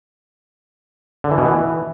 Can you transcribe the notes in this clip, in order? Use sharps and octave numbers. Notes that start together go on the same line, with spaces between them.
D3
E3
B2
E3